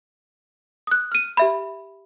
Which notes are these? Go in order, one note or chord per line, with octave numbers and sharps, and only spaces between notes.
D#6 F#6
F6 D#7
G4 E5 B5